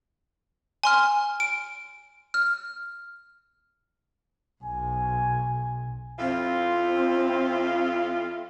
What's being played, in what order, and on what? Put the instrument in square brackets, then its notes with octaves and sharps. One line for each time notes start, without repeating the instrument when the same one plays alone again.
[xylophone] G#5 C6 F6
D7
F6
[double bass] B1 [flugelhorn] G#5
[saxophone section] F2 E4 F4 [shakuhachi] C4